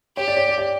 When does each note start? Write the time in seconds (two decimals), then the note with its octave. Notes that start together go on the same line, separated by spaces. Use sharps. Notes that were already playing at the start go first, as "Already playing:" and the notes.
0.17 G4 C#5
0.28 D5
0.37 C#5
0.48 D5
0.58 D5